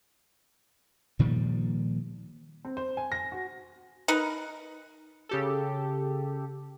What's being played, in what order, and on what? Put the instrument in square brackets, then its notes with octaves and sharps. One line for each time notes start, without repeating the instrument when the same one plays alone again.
[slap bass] A#2 D#3 F3 G3
[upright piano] C4
C5
G#5
A#6
F#4
[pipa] D#4 A#4 B4
[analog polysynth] C#3 G4 A4